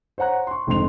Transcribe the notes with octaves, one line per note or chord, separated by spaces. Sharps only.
C5 C#5 F#5 A#5 F#6
C6 C#6
F1 F2 G#2 D#3 C6 F7